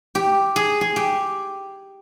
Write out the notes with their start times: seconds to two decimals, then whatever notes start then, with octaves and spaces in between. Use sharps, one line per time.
0.15 G4
0.56 G#4
0.81 G#4
0.96 G4